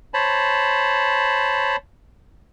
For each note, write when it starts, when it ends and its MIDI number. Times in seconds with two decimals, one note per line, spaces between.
0.14 1.76 72
0.14 1.76 73
0.14 1.76 81
0.14 1.76 83